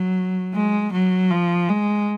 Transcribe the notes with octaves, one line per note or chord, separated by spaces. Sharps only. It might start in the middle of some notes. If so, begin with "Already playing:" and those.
Already playing: F#3
G#3
F#3
F3
G#3